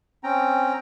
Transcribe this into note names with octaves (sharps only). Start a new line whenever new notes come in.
C4 C#4 G5 A#5